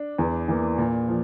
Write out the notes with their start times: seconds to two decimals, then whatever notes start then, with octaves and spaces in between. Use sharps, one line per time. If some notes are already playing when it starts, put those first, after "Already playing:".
Already playing: D4
0.18 E2
0.48 E3 A#3
0.78 A#2
1.08 F3